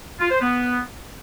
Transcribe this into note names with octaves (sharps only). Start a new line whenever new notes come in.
F4
C5
B3